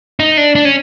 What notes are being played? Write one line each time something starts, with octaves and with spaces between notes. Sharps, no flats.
D#4
D4
D4
C#4